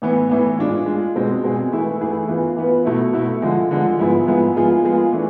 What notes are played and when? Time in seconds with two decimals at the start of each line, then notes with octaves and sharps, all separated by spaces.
0.02 A2 E3 B3
0.29 A2 E3 B3
0.58 G#3 D4 F4
0.86 G#3 D4 F4
1.15 B2 G#3 C4 G#4
1.44 B2 G#3 C4 G#4
1.72 E3 A3 E4 G#4 B4
2.00 E3 A3 E4 G#4 B4
2.28 E3 B3 F4 B4
2.57 E3 B3 F4 B4
2.85 B2 A3 E4
3.13 B2 A3 E4
3.42 D3 F3 G#3
3.71 D3 F3 G#3
3.99 G#2 F3 B3 E4 G#4
4.27 G#2 F3 B3 E4 G#4
4.56 F3 G#3 B3 F4 G#4
4.84 F3 G#3 B3 F4 G#4
5.13 E3 A3 D4